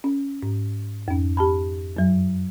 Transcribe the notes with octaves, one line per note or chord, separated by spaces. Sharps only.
C#4
G#2
F2 C#4
G4 A5 B5
F#2 F#3